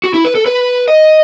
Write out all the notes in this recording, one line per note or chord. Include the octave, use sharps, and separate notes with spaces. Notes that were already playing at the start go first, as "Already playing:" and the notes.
F#4
E4
B4
A4
B4
D#5